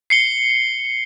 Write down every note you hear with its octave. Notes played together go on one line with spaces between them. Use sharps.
C7 C#7 G7